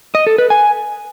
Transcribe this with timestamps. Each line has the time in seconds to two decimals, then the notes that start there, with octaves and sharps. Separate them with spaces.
0.15 D#5
0.27 A4
0.38 B4
0.50 G#5